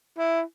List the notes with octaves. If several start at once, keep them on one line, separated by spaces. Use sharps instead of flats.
E4